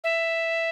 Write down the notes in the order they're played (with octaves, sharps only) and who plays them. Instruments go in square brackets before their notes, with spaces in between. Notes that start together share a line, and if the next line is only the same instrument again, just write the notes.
[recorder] E5